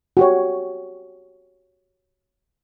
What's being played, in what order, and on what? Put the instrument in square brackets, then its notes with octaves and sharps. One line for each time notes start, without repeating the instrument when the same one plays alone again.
[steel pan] F#4 G4 C#5